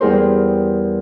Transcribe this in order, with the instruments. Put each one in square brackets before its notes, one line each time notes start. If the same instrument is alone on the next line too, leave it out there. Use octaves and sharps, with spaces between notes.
[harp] E2 G3 E4 G#4 A#4 C5